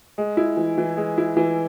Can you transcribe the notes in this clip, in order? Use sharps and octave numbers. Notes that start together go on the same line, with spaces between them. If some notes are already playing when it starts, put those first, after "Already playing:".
G#3
E4
E3
E3
G#3
E4
E3